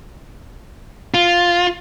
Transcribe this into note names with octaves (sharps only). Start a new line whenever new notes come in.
F4